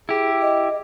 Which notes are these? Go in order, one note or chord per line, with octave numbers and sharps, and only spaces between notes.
E4 G4 G#4
D#5